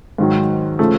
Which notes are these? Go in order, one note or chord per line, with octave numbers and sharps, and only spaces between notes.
G#2 D#3 F#3
C#3 F3 A3